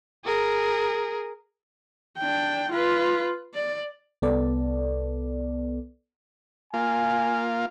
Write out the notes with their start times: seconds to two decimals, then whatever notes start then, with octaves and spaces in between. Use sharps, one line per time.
0.25 G#4 A#4
2.19 D4 G5
2.72 F4 B4
3.54 D5
4.22 C2 B3 A4 D5
6.74 A#3 F4 G#5